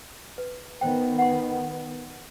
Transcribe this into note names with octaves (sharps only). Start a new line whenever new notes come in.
B4
D#3 B3 C5 G5
F#5 C6